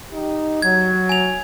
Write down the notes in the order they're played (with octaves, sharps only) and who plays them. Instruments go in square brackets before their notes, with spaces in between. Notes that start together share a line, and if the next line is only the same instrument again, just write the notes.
[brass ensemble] D#4 G4
[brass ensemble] F#3 [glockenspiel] G#6
[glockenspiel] G#5 F7